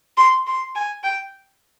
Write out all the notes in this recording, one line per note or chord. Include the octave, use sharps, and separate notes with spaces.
C6
C6
G#5
G5